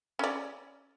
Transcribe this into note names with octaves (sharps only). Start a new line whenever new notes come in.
C#4 D5